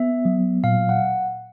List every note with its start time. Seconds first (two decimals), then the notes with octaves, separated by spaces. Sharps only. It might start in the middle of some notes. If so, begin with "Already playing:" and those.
Already playing: B3 E5
0.25 F#3
0.64 A#2 F5
0.89 F#5